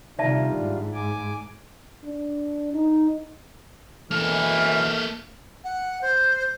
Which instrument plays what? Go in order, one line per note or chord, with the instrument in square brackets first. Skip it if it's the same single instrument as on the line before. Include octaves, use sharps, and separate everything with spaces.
[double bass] C3 D#3 [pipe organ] G3 D4 F4 [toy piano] D5 E5 A5
[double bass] G#2
[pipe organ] G#5 D6
[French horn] D4
D#4
[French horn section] F#2 B2 E3 [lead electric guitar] A#3 A4 [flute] F6
[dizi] F#5
C5